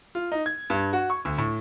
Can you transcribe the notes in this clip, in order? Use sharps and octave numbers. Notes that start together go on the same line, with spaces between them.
F4
D#4
G#6
G2
F#4
C#6
D2
A2